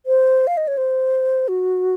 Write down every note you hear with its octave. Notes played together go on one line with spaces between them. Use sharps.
C5
F5
D#5
C#5
C5
F#4